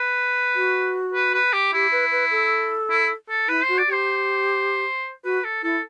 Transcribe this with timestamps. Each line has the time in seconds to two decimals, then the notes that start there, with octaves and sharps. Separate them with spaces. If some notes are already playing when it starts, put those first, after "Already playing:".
Already playing: B4
0.55 F#4
1.14 B4
1.34 B4
1.53 G4
1.73 E4 G4
1.92 B4
2.11 B4
2.31 A4
2.90 E4
3.29 A4
3.48 E4 B4
3.64 F#4 C5
3.78 D5
3.88 G4 C5
5.25 F#4 B4
5.44 A4
5.63 E4 A4